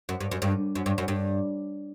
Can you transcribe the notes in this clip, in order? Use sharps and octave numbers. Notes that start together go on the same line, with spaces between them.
F#2
G2
F#2
G2
F#2
G2
F#2
G2